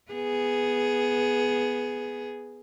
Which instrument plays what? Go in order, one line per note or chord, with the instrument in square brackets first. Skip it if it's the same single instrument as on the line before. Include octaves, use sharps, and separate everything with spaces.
[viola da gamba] B3 G#4